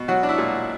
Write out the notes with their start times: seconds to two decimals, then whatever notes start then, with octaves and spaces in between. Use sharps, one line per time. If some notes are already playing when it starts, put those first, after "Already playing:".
Already playing: B2
0.08 F#3 F#4
0.23 D4
0.29 E4
0.38 A#2